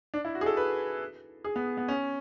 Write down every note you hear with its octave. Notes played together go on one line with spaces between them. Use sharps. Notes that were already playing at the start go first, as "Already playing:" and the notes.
D4
E4
F#4
G#4
A4
B4
G#4
B3
B3
C#4